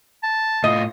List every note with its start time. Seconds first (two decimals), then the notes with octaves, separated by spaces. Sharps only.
0.23 A5
0.64 A2 F4 D#5